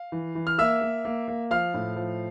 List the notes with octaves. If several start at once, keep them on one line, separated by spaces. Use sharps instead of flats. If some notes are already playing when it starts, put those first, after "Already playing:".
Already playing: F5
E3
E3
F6
A#3 E5 E6
A#3
A#3
A#3
F3 F5 F6
A2
F3